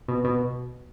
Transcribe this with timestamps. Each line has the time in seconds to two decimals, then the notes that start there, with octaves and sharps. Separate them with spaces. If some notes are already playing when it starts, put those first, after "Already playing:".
0.08 B2
0.25 B2